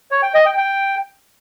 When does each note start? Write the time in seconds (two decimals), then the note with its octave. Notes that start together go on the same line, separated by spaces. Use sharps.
0.11 C#5
0.23 G5
0.34 D#5
0.46 G5
0.57 G5